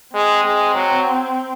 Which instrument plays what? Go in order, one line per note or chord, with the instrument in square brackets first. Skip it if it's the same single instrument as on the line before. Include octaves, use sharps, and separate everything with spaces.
[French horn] G#3 [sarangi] C4
[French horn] G#3
F#3